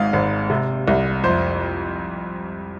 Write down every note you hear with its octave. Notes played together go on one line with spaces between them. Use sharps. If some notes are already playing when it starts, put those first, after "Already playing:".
Already playing: G#1 G#2 F5
G#1
C3
C2
F2 C5